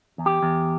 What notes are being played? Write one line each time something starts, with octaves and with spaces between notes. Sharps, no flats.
E2
G4
E2